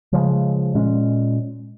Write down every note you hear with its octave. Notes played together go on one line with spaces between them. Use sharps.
C#3 F3 G#3
A#2 G#3 C#4